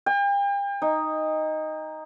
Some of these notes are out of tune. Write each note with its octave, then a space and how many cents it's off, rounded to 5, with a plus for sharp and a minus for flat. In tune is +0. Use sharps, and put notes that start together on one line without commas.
G5 +40
D#4 +0